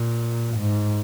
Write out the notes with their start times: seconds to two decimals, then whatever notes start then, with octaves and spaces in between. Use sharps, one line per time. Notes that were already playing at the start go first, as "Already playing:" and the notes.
Already playing: A#2
0.58 G#2